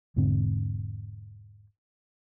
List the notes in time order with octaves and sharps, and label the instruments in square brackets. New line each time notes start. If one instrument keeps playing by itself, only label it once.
[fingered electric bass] E1 G#2 D3 C4